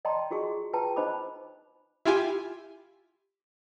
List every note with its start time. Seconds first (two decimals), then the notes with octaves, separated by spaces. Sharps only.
0.05 D5 D#5 G5 A5 A#5 C6
0.31 F4 F#4 G#4 C#6
0.73 F4 G#4 B4 G5 A5 A#5
0.96 D#4 C5 D#5 B5 D6
2.05 E4 F4 G4 G#5